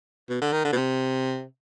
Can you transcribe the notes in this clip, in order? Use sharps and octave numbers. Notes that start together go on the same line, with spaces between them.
B2
D3
D#3
D3
B2
C3